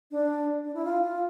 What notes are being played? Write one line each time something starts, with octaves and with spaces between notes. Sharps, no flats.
D4
D4
E4
F4
F4